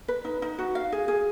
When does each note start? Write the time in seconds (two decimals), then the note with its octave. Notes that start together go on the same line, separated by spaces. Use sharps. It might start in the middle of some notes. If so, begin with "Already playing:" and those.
0.08 B4
0.25 D#4
0.42 D#4
0.59 F#4
0.75 F5
0.92 G#4
1.08 G#4